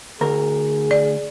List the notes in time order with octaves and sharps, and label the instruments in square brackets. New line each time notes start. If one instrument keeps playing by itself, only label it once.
[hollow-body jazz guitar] D2 A#4 [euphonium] G#4
[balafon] D5